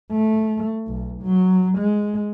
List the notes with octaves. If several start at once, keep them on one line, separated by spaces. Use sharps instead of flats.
A3
B1
F#3
G#3